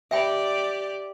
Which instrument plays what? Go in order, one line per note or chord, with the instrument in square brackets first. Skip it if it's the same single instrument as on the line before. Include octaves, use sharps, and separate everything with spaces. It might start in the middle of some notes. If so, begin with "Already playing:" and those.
[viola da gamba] G4 D5 [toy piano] E5 G5 B5